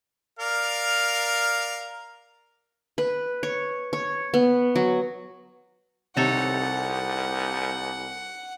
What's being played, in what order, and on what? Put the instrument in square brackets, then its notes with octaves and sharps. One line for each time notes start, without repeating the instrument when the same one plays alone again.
[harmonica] A#4 D5 F5
[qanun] B4
C#5
C#5
B3
F#3
[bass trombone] C2 [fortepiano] C3 [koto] D#4 A4 C#5 [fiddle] F#5